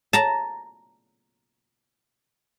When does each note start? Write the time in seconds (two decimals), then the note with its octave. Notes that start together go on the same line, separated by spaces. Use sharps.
0.13 A5 A#5